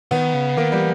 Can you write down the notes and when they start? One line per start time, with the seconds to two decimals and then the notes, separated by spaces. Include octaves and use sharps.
0.11 D#3 B3
0.34 C#3
0.57 D#3 A#3
0.72 E3 G3